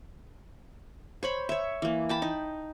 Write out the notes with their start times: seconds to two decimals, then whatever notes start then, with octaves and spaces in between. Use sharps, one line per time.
1.23 C5 C#5 B5
1.49 C#5 E5
1.82 E3 A#3
2.09 G5 A5 B5
2.22 D#4